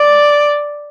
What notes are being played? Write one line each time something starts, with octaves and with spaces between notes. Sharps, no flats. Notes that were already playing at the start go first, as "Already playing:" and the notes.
Already playing: D5